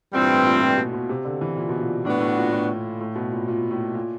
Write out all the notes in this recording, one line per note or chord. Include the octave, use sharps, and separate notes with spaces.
G2 A#2 E3 G3 C4
A2
A#2
A#2
B2
B2
C3
D3
E3
A#2
B2
A#2
A2 B3 D4 F#4
A2
A#2
A2
A2
B2
A#2
A#2
A2
A#2